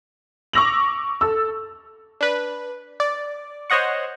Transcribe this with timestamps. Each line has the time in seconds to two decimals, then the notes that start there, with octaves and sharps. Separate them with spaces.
0.53 C#6 D6 E6 A#6 F7 F#7
1.21 A4 E6
2.21 D4 B4
3.00 D5
3.70 C5 C#5 D#5 F#5 C#6